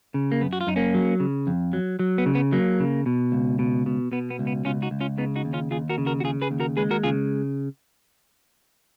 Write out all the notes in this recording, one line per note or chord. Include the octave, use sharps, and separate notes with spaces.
C#3
A#3
F#2 B3
F#4
F4
F#2 D#4
A#3 C#4
F#3
C#3
F2
F#3
F#3
B3
C#3
B3
F#3 A#3
C#3
B2
C#2
B2
B2
B2 B3
B3
C#2
B3
C#2 C#4 F4
D#4 F#4
C#2
C#4 F4
C#3 B3 D#4
D#4 F#4
D#2
C#4 F4
D#2 F4 G#4
F#4 A#4
C#3
F#4 A#4
F#4
C#3 F4 G#4
G#4 B4
D#2
F#4 A#4
G#3 G#4 B4
F#4 A#4
C#3 F4 G#4